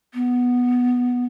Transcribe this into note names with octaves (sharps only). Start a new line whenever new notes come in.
B3